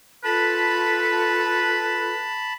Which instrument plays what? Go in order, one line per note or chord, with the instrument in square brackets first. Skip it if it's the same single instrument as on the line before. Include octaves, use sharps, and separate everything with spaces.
[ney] F4 [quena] A4 [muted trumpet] B4 [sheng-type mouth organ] A5 B5